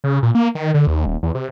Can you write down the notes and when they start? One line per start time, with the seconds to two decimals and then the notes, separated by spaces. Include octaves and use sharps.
0.04 C#3
0.23 A#2
0.35 A#3
0.55 D#3
0.74 D3
0.87 D#2
1.06 D#1
1.23 E2
1.35 C3